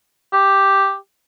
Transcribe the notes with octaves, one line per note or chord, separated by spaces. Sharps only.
G4